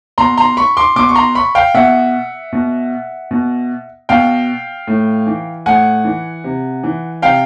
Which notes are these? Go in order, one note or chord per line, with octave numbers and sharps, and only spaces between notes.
B2 A#5 C6
A#5 C6
B5 C#6
C6 D6
B2 C6 D6
C#6
A#5 C6
B5 C#6
F5 G5
B2 E5 F#5
B2
B2
B2 F5 G5
A2
E3
A2 F#5 G#5
E3
C3
E3
C3 F5 G5